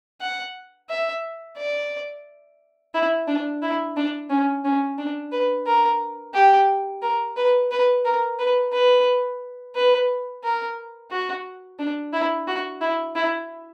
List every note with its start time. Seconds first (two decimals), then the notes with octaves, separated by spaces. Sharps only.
0.21 F#5
0.90 E5
1.58 D5
2.94 E4
3.28 D4
3.62 E4
3.97 D4
4.30 C#4
4.65 C#4
4.98 D4
5.32 B4
5.67 A#4
6.35 G4
7.02 A#4
7.37 B4
7.71 B4
8.05 A#4
8.39 B4
8.73 B4
9.75 B4
10.44 A#4
11.11 F#4
11.79 D4
12.13 E4
12.47 F#4
12.81 E4
13.15 E4